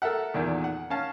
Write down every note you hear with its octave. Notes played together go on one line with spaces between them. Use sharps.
A4 A#4 E5 F#5
E2 A#2 D#3
F#5
C#4 F5 A5